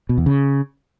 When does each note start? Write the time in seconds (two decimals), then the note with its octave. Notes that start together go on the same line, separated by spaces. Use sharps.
0.09 B2
0.18 E2
0.26 C#3